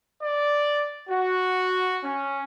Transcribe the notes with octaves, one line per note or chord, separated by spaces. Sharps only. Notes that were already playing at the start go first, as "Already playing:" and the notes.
D5
F#4
C#4